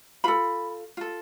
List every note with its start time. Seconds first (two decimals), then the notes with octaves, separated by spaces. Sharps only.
0.24 F4 A4 B5
0.97 F4 A4